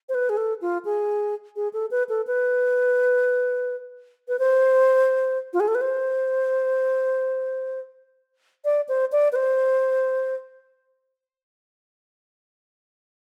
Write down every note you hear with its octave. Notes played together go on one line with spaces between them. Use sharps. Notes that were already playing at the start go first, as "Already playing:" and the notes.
C5
B4
G#4
A4
F4
G#4
G#4
A4
B4
A4
B4
B4
C5
F4
G#4
A4
B4
C5
D5
C5
D5
B4
C5